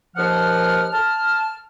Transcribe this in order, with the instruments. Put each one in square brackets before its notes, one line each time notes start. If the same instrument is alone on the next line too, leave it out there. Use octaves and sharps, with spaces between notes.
[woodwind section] D#2 F3 F#5 F6
A5 F6